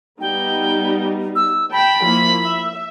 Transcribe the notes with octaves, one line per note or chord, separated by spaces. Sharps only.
G3 B3 D#4 G5
E6
G5 A5 B5
F3 A#3 E4
E5